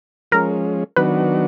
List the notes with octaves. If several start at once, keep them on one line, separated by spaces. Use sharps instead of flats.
F3 G#3 C#4 A#4
D#3 F#3 B3 D4 F#4 B4